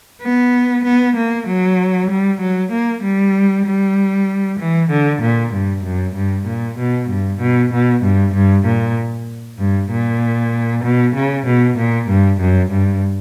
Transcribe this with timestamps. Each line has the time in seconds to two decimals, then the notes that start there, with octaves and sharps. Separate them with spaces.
0.22 B3
0.84 B3
1.16 A#3
1.47 F#3
2.10 G3
2.41 F#3
2.72 A#3
3.03 G3
3.66 G3
4.59 E3
4.90 D3
5.22 A#2
5.53 G2
5.84 F#2
6.15 G2
6.46 A#2
6.78 B2
7.09 G2
7.40 B2
7.72 B2
8.02 G2
8.34 G2
8.65 A#2
9.58 G2
9.91 A#2
10.84 B2
11.15 C#3
11.46 B2
11.77 A#2
12.08 G2
12.41 F#2
12.71 G2